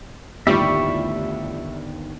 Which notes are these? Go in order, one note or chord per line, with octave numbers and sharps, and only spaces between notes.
G1 D#2 A2 F3 G3 E5 B5 C#6